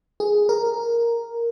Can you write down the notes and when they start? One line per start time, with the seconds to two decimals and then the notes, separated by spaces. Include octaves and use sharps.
0.20 G#4
0.49 A#4